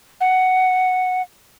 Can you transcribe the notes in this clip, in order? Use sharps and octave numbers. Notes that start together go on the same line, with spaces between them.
F#5